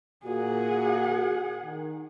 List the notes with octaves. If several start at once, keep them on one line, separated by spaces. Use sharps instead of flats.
A#2 F#4 G#4 F#5
D#3